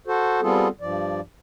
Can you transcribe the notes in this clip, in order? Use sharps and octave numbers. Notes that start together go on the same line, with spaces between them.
F#4 A4 C5
G3 B3 C4 F4 G#4 A4
G2 F3 D5